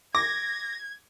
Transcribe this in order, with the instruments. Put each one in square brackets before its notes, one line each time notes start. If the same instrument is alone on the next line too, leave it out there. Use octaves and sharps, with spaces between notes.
[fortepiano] D6 [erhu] G#6 [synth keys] A#6